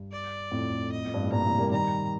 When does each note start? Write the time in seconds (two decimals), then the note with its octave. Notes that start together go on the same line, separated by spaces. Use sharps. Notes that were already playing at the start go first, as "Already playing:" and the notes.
Already playing: G2
0.12 D5
0.51 F2 A2
0.92 D#5
1.05 F2
1.14 G2
1.23 A2
1.32 G2 A#2 A#5
1.45 A2 C3
1.59 G3 A#3
1.72 D#3 G3 A#5